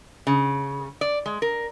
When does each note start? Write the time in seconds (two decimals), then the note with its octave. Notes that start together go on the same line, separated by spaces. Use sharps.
0.27 C#3
1.01 D5
1.26 G#3
1.42 A#4